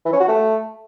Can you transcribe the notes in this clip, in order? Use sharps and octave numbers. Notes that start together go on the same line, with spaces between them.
E3
C#4
F#4
A3